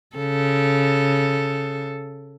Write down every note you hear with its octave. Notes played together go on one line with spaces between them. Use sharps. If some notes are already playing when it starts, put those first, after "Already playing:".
C#3 A4